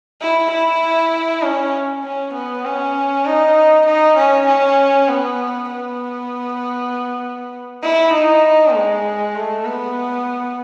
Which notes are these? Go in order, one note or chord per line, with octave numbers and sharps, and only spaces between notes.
E4
E4
C#4
C#4
B3
C#4
D#4
D#4
C#4
C#4
B3
B3
E4
D#4
G#3
A3
B3